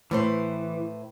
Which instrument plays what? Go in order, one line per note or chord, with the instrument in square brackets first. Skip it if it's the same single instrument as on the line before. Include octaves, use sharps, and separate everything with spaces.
[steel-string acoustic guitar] A2 B4 C5 [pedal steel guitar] E3